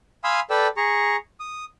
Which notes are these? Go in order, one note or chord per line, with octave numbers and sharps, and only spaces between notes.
F5 G#5 B5 C6 D#6 E6
A4 B4 D5 G5 E6
G#4 A#5 C#6
D#6